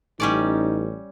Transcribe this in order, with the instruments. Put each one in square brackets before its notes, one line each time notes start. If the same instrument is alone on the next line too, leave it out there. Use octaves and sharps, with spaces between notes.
[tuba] A1 [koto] G3 C#4 D5 [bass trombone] D#4